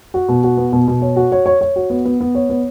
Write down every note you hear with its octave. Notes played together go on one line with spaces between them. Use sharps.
F#4
B2
F#4
B3
B2
B2
C#5
F#4
C#5
C#5
C#5
F#4
B3
B3
B3
C#5
B3